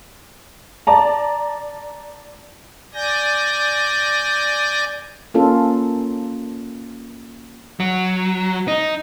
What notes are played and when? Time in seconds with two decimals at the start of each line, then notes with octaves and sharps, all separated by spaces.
0.87 D5 A5 A#5
2.94 D5 G#5 G6 A#6
5.34 A#3 C#4 F4 A4
7.80 F#3
8.68 D#4